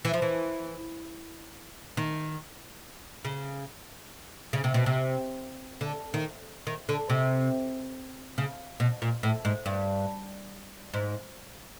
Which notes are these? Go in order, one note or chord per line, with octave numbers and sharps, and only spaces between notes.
E3
F3
E3
D#3
C#3
C#3
C3
B2
C3
D3
D#3
D#3
D3
C3
C#3
B2
A#2
A2
G#2
G2
G#2